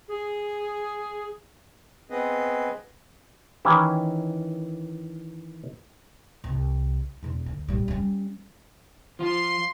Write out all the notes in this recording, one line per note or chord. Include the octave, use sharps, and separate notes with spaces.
G#4
B3 C4 G#4 B4 D#5
D#3 E3 C#4 E4
C2
E1 E2
D2
A#1 G3
G3 C#4
F3 F4 C6